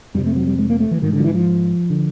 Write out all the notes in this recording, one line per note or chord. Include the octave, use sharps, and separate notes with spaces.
F2 C3 G3
A3
F#3
G3
G#3
A#3
A3
E3
G#2 D#3
D3
F3
E3
F3
D3